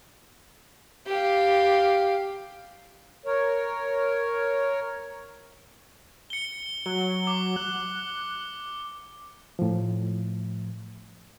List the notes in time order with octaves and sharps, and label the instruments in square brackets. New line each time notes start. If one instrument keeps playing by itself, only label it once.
[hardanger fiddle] G4 F5
[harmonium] A#4 C#5
[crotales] C#7 G7
[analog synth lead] F#3 [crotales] G7
[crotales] D6
[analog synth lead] F#6
[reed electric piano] A2 F3